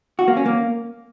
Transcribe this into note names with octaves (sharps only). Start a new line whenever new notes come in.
F#4
A#3
C#4
A#3